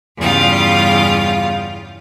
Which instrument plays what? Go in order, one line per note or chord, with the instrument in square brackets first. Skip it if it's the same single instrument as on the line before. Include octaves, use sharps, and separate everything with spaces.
[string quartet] E2 G2 C#3 G3 F4 F5